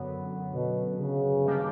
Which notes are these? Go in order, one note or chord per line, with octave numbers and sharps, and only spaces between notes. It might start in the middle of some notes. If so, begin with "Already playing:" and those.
Already playing: F#2 D3 F#3 B3
B2
C#3
D#3 G3 A#3 D4 G4